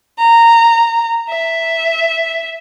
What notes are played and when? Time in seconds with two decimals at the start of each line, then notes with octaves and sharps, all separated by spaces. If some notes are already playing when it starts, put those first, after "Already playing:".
0.19 A#5
1.30 E5